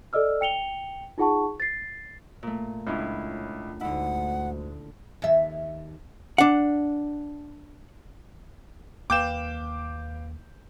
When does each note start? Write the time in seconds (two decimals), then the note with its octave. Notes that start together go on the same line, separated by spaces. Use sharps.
0.13 A4 D5 D#5 E6 F6
0.41 G5 C#7 F7 G7
1.18 D#4 F4 G#4 F#5 A5 C#6
1.60 A6 C7
2.43 A#2 A3
2.87 C#2 C#4 D4 E4 F4
3.81 D2 G#2 D3 E4 F#5
5.22 D#2 E5
6.38 D4 F#5
9.10 D#2 A#3 B4 F5 G5 D6 G6 E7